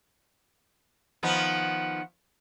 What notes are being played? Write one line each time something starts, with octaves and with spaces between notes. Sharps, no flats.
D#3 F3 B3 F#5